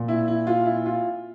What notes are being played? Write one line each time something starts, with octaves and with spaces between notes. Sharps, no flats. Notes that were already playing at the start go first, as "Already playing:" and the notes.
Already playing: A#2
E4
E4
F4
E4
F4